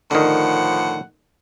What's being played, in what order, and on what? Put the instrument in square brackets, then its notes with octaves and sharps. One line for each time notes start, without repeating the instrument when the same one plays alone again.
[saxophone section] A2 F3 F#5 [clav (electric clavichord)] D3 D#3